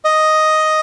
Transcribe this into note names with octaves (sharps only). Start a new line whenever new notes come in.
D#5